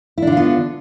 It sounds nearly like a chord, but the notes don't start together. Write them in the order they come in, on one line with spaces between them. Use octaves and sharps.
E4 D4 D3 F4 B3